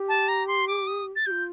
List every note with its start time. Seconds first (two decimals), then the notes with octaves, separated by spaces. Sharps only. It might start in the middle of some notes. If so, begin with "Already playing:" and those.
Already playing: G4
0.09 A5
0.28 A#5
0.48 C6
0.68 D6
0.87 D#6
1.16 A6
1.26 G4 G6
1.31 F4